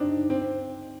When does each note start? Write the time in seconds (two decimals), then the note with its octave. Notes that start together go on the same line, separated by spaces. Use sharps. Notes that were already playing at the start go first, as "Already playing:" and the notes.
Already playing: C4 D4 D#4
0.30 C4